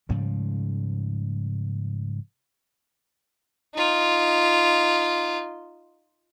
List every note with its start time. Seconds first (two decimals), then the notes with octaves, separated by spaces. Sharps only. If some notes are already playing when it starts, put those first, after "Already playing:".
0.09 G#2 C#3 F3 G3
3.75 D#4 F4